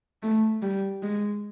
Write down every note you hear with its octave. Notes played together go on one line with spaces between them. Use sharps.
A3
G3
G#3